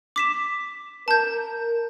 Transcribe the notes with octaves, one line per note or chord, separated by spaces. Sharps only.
D6 B6 E7
A#4 A5 G6